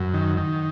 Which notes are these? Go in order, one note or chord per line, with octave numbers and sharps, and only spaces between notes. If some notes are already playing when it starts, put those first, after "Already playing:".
Already playing: F#2
D#3
D#3